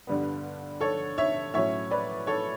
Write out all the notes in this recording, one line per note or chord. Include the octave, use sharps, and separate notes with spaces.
G2 D3 G3 B3
A4 C#5
C#5 E5
A2 F#3 C#4 C#5 E5
B4 D5
A4 C#5